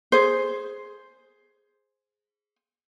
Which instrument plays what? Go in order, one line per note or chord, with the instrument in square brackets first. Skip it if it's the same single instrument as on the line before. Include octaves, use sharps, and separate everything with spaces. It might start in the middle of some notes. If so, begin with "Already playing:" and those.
[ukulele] G#4 C5